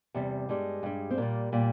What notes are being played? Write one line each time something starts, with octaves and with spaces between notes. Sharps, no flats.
E2 C3 G3
G2 G3 G#3
G2 G3
C4
A#2 G3 A#3
A#2 G3